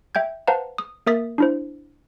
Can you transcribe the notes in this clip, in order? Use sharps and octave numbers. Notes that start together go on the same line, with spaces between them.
E5 G5 G6 G#6
B4 C5 F5 F#5 A5 A#5
D#6
A#3 A#4 E5 D#6 A6 B6
D4 E4 C5